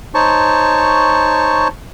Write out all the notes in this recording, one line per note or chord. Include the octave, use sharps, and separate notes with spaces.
D#4 C5 C#5 A5 C#6